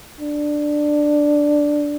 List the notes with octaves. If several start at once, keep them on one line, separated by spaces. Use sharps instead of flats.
D4